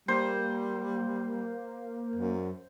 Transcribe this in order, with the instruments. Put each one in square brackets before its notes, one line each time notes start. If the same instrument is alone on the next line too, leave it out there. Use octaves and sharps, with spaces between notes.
[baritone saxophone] G3 [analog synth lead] A#3 [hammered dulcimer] C5
[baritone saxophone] F#2